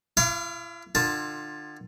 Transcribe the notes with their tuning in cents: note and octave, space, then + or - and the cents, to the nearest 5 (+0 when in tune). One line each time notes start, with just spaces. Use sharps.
E4 +40 F5 -10 D6 -15
D3 +35 F4 +15 A5 +0